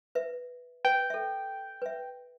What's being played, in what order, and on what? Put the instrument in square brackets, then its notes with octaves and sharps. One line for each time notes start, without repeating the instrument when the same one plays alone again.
[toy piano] B4 E5
[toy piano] B4 [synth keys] G5
[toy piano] A4 E5
B4 E5